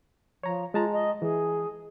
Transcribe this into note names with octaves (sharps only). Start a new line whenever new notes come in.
F3 C#5 A#5
G#3 F4 A5 A#5
D#5
E3 G#4